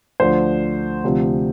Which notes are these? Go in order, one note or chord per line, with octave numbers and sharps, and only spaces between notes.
D2 D3 F3 C5
D2 C3 F3